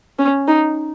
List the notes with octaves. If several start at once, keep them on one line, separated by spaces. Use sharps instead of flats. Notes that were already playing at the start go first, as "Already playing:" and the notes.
C#4
D#4